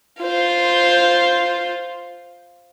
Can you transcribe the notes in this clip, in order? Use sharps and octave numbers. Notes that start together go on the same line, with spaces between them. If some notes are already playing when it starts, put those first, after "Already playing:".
F4 C5